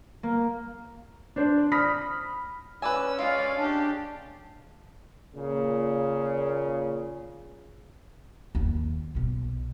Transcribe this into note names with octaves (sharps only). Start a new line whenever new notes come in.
A#3
D4 C5 D5
B5 D#6 F6 A#6 B6
C#4 B4 D5 G#5 E6
G#3 F4 D5 F5
D4 G4
A#2 C#3
D#2
B1 B2